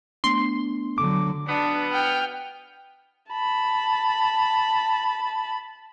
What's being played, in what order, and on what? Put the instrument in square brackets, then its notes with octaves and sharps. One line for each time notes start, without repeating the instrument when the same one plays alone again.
[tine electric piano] A3 B3 D4 [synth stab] C6
[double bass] D3 F#3 [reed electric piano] D6
[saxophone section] B2 B3 [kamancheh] D4
[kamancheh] G5 F6
A5 B5